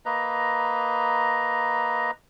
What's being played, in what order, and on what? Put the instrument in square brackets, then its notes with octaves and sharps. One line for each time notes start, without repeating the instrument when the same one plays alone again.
[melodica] A#3 B4 D#5 A#5